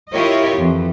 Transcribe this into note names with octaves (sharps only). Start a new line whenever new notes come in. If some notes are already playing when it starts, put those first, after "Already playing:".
E4 F4 G4 A#4 C#5 D#5
F2 E3